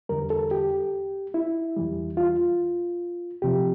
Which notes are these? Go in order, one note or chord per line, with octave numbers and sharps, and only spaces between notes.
E2 D3 G3 A#4
A4
G4
E4
E2 E3 G3
F4
D2 C3 F3 G4